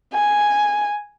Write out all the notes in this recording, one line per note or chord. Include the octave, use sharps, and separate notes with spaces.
G#5